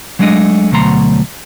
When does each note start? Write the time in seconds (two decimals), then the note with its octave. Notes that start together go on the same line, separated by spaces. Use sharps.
0.19 F#3 G#3 A3 D4 D#5
0.72 D2 B2 F#3 A3 A#5 C6